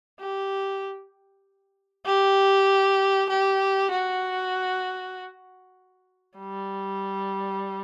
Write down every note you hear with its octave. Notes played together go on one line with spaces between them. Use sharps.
G4
G4
G4
F#4
G3